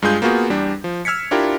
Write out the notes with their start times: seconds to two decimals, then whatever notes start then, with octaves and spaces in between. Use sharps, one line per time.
0.02 G2 G#3 F4 G#4 G6
0.22 A#3 B3 F4 F#4 G#4
0.50 E2 G3 D4
0.84 F3
1.05 E6 F6 G#6 B6 C#7
1.31 D4 E4 F4 G4 A#4